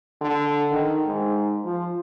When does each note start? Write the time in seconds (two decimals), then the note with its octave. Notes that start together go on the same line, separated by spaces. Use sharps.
0.21 D3
0.72 D#3
1.06 G#2
1.65 F3